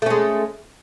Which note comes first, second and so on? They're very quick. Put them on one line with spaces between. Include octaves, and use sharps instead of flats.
A3 C#4 G#3